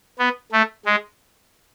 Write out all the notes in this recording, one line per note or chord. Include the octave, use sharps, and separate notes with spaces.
B3
A3
G#3